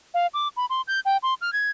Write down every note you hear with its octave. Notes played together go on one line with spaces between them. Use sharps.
F5
D6
B5
C6
G6
G5
C6
F6
G#6